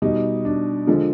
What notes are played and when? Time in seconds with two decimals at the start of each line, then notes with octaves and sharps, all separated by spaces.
0.02 B2 G3 D#4
0.45 D4
0.87 D3 F3 G#3